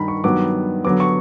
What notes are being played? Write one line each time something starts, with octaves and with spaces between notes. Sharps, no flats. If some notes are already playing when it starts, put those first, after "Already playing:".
Already playing: G2 D#3 A#5 B5
C#6
G2 D#3 F#3 B3 D6
D3 F#3 B3 D6
C#6